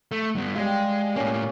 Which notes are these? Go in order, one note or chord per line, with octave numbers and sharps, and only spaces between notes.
A3
G2 B3
G3 G#3 F5
A2 A#3 C#4 D5